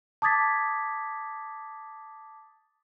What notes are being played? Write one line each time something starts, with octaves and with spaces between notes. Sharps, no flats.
A5 D6 D#6 G#6 A6 B6